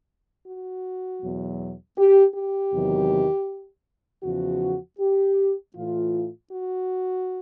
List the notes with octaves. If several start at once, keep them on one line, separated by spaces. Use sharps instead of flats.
F#4
E2 B2 F#3
G4
G4
E2 C3 D#3 F#3
E2 C#3 F3 F#4
G4
A2 E3 F4
F#4